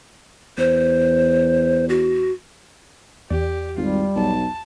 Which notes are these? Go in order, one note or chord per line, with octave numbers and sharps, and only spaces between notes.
E2 C5
F#4
E2 G4 D5
G#1 G3 F4
B1 A5